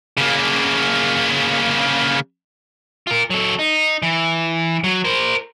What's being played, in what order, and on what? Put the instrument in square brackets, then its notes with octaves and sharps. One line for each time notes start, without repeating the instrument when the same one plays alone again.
[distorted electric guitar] C#3 A#3
[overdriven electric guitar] F4 A#4
F#3 A4
D#4
E3
F#3
A#4 C5